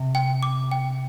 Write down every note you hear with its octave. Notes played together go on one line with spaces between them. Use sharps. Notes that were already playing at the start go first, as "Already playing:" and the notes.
Already playing: C3
G5
D6
G5